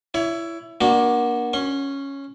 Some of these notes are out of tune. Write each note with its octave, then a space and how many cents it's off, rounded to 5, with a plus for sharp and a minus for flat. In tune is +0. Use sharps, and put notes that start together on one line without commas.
E4 +15 C#5 +30
A#3 +25 D4 -5 F#4 -10
C#4 +0 C6 +45